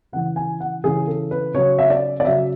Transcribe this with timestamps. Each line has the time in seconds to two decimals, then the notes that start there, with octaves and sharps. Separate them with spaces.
0.12 C#3 E3 F#5
0.36 G#5
0.60 F#5
0.84 C#3 E3 G#4
1.07 A4
1.31 B4
1.54 C#3 F#3 C#5
1.78 E5
1.90 D5
2.20 D5
2.25 C#3 F#3 E5